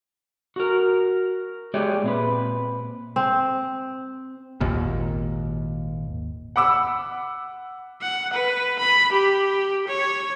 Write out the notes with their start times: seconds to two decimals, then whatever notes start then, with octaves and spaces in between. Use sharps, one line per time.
0.56 F#4 A#4
1.74 G#3 G4 G#4 C#5 D5 E5
2.03 A#2 C4 B4
3.16 C4
4.61 G#1 D#2 A#2
6.56 F#5 B5 D6 E6
8.02 F#5
8.33 B4
8.80 B5
9.13 G4
9.88 C#5